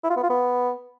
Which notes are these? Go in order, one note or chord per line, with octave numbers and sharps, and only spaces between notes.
E4
F4
B3
F4
B3